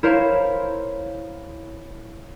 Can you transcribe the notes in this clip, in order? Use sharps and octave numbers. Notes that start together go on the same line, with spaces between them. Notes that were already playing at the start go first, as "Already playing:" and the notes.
E4 A#4 C5 C#5 F5 B5